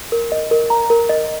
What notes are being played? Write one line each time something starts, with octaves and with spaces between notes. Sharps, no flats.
A#4
D#5
A#4
A#5
A#4
D#5